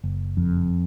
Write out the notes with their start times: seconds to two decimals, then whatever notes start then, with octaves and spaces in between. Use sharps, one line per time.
0.04 F#1
0.37 F2